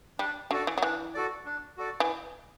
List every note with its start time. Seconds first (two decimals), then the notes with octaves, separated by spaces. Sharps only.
0.19 G3 D4
0.51 D3 F#4 A4 D5
0.67 E3
0.78 F#3
0.82 E3 D4
1.14 F#4 A4 D5
1.46 D4
1.78 F#4 A4 D5
2.00 E3